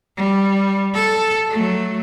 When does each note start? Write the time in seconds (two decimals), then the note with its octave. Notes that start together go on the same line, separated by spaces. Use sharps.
0.17 G3
0.94 A4
1.50 F#3 A3